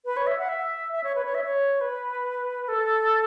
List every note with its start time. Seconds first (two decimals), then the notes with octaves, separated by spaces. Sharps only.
0.05 B4
0.17 C#5
0.27 E5
0.38 F#5
0.49 E5
0.93 E5
1.04 C#5
1.15 B4
1.25 C#5
1.35 E5
1.44 C#5
1.81 B4
2.68 A4